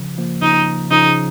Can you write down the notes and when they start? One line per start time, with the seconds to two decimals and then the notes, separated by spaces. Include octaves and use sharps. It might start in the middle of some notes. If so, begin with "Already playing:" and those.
Already playing: C#3 F3
0.18 F3 A#3
0.42 C#3 F3 D#4
0.90 C#3 F3 D#4
1.07 C#3 F3